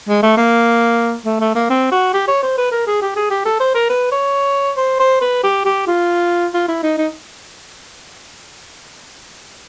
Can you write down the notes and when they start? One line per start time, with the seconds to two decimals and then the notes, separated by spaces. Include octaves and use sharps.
0.08 G#3
0.23 A3
0.37 A#3
1.25 A3
1.40 A3
1.55 A#3
1.70 C4
1.92 F#4
2.13 G4
2.28 C#5
2.43 C5
2.58 B4
2.72 A#4
2.87 G#4
3.01 G4
3.16 G#4
3.30 G4
3.45 A4
3.60 C5
3.75 A#4
3.90 B4
4.12 C#5
4.77 C5
4.99 C5
5.21 B4
5.43 G4
5.65 G4
5.87 F4
6.54 F4
6.68 E4
6.83 D#4
6.98 D#4